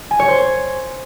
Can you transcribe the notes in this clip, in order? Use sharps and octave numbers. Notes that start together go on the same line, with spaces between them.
G#5
C#5
C5